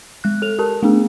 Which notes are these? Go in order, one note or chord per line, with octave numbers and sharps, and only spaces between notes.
G#3 F#6
A4 F7
G4 A#4 A5
A3 B3 D4 G#4